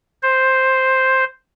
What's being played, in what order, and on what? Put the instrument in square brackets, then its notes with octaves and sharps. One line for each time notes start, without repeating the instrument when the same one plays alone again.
[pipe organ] C5